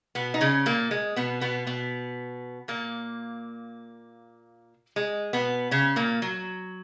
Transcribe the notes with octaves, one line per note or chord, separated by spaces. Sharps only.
B2 B3
D#4
C#3 C#4
A#2 A#3
G#3
B2 B3
B2 B3
B2 B3
A#2 A#3
G#3
B2 B3
C#3 C#4
A#2 A#3
F#3